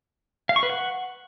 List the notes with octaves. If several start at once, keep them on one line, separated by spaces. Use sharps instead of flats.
F5
C#6
B4
F#5